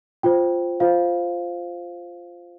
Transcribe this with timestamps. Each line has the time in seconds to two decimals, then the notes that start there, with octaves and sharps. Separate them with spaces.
0.23 F4 C5 G5
0.80 F4 C5 F5